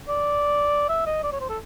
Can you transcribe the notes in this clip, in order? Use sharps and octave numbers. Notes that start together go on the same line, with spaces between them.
D5
E5
D#5
D5
C#5
C5
A4